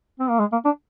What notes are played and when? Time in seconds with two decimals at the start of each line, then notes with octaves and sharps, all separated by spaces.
0.20 C4
0.30 A#3
0.40 G#3
0.52 A#3
0.65 D4